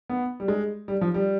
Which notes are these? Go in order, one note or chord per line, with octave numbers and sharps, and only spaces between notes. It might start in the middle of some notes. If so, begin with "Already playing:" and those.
B3
G3
G#3
G3
F3
G3